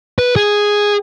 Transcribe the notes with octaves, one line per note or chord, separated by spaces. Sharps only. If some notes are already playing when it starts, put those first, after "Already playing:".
B4
G#4